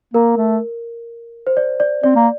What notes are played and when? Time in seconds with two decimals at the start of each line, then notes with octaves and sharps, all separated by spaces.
0.14 A#3 A#4
0.37 A3
1.47 C5
1.57 D5
1.80 D5
2.04 C4 D5
2.16 A#3